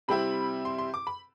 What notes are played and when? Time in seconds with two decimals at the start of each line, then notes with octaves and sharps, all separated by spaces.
0.08 C3 G3 C4 E4 B5
0.65 C6
0.78 C6
0.94 D6
1.07 B5